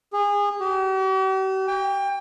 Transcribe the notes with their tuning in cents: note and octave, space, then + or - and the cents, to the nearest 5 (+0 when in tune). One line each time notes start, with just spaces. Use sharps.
G#4 -30
G4 -45
G5 +25